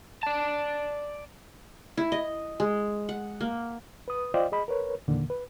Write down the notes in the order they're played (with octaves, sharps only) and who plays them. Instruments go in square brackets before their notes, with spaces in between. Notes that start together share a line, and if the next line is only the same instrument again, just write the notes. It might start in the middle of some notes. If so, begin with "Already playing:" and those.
[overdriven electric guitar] D5 A5
[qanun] E4
D#5
G#3
F#5
A#3
[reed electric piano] B4 D#6
F4 C5 D5 D#5 F5 G5
G#4 D#5 B5
A#4 B4 C#5
E2 A#2 D3 D#3 A#3
B4